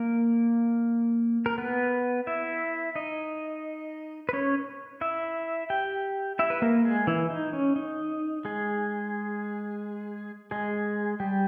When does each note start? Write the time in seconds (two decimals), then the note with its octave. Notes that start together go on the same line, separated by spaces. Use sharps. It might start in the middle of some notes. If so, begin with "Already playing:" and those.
Already playing: A#3 A#4
1.46 A#4
1.58 B3 B4
2.27 E4 E5
2.95 D#4 D#5
4.29 B4
4.33 C#4 C#5
5.01 E4 E5
5.70 G4 G5
6.39 E4 E5
6.50 B4
6.62 A#3 A#4
6.85 G#3 G#4
7.07 E3 E4
7.30 D#4
7.53 C#4
7.76 D#4
8.45 G#3 G#4
10.51 G#3 G#4
11.20 G3 G4